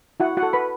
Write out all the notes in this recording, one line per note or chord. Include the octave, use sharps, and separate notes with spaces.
E4 F#4 F#5
F#4 F#5
A4
B4 B5